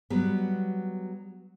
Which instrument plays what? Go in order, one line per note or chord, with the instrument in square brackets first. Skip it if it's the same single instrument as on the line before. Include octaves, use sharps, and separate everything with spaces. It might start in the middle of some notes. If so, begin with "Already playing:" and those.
[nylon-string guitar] F#3 G3 B3